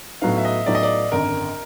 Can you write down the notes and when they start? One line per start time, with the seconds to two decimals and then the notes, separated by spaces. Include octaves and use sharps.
0.22 A2 F#3 B3 D#4 F5
0.38 E5
0.45 D#5
0.66 A2 F#3 B3 D#4 D5
0.75 D#5
0.83 D5
1.12 G#1 F#2 D3 A#4